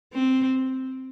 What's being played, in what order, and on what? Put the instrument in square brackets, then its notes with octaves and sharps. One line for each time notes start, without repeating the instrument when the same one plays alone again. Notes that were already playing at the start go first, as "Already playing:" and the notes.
[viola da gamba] C4